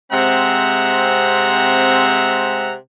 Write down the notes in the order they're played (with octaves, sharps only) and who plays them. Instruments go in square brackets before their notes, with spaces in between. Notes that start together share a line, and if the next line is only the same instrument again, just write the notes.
[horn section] C3 G#3 C4 E5 F#5 A#5